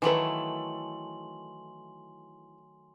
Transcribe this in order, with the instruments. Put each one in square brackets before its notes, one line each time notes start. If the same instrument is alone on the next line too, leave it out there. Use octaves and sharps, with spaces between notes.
[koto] D#3 F#3 A3 [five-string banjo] E3 B4 [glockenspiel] G#5 C6 F#7